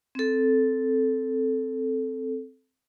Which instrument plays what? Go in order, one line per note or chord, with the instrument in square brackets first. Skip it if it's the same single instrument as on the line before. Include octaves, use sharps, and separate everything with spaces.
[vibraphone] C4 A4